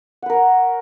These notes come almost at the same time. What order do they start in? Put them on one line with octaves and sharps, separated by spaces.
F#5 B4 A#4 C#5